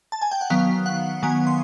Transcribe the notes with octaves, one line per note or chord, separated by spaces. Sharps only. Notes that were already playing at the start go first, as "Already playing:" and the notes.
A5
G#5
G5
F#5
D#3 F#3 B3 F5
F#5
D#3 F#3 B3 G#5
C6